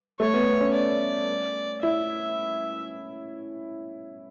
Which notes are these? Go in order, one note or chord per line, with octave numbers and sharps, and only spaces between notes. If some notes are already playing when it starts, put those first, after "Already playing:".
A3 C#5
B3
B3
C#4
D5
E4 E5